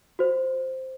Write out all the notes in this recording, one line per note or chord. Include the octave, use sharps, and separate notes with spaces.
F#4 C5